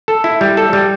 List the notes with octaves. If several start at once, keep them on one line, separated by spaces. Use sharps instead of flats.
A4
E4
G3
A4
G3